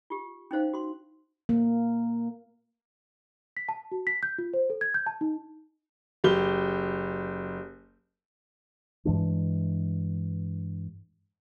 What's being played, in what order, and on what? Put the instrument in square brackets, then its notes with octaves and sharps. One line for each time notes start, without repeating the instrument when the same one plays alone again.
[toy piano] F4 G4
C#4 D#4 C5 F5
F#4 C6
[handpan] A#3
[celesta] B6
A5
F#4
B6
G6
F4
C5
A4
G#6
G6
A5
D#4
[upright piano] F#1 G4 G7
[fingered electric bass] G2 E3 G#3 D4